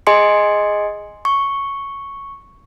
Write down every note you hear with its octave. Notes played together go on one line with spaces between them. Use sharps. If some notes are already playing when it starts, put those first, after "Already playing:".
G#4 D#5 G#5 C6 C#7
C#6